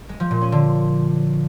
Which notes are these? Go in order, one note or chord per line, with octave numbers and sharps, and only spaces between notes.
G#3
F3
A#2
C#4
D3